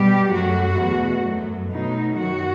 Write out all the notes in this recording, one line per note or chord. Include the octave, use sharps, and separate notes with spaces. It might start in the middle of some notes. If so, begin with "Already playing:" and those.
Already playing: B2 G3 G4
F#2 F#3 A3 F#4
E2 B2 A3
F#2 F#3 A3
B2 F#3 A3 D#4
F#2 D#3 F#3 F#4